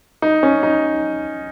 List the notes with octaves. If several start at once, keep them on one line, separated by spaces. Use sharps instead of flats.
D#4
C#4
D#4